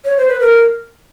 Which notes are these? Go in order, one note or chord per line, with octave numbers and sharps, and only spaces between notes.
C#5
C5
B4
A#4